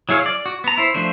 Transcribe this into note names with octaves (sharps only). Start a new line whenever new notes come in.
F#3 E4 G#4 C#5 F5
D5
F#4
B3 A#5
E4 C5
F3 A3 D4 C5